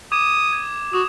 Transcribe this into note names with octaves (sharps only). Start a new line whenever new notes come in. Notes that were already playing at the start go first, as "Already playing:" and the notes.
D6 D#6 G#6 E7
G#6
F#4 D#6 E7 F7